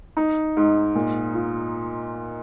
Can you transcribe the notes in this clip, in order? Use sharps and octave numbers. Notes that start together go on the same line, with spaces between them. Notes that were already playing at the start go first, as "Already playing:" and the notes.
D#4
G#2
A#2
F4